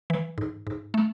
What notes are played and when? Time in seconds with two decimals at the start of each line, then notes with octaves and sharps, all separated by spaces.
0.10 E3
0.38 G#2
0.67 G#2
0.94 A3